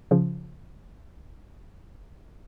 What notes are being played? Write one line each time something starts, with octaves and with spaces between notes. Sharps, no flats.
C#3 F3